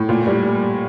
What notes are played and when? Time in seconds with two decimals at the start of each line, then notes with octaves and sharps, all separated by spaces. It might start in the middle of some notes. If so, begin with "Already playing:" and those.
Already playing: A2
0.09 A#2
0.27 G3